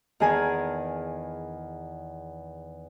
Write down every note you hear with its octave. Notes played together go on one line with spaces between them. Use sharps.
E2 D#3 G#4 A#4 G#5 A5